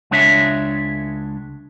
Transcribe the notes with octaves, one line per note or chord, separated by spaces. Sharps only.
C#2 G#3 D4 C#5 E5